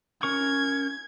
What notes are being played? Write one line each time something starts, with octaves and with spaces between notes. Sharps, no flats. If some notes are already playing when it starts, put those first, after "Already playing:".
C#4 A#4 C#6 G#6